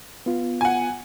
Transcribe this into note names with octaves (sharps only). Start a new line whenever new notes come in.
B3 F4
F#5 G#5